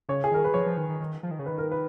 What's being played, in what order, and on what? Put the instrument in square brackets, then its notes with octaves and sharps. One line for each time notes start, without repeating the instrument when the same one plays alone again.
[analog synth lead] C#3 [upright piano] C#5
[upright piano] G#4
[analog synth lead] D#3 [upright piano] A#4
[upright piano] B4
[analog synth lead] F3 [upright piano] C#5
[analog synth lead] F3
D#3
D#3
D#3
F3
D#3
C#3
[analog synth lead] D#3 [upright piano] B4
[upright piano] A#4
B4